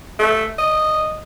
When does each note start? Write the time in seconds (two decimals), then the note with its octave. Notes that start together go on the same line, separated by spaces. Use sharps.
0.19 A3
0.59 D#5